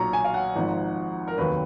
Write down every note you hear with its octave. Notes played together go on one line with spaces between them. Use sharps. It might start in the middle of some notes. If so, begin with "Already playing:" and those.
Already playing: B1 A#2 F#3 A#5 C#6
G#5
F5
F#5
G#1 G#2 F3
A#4
F1 D#2 D#3 F#3 B4